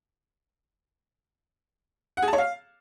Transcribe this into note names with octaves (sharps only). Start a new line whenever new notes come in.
F#5
G#4
A5
C#5
F5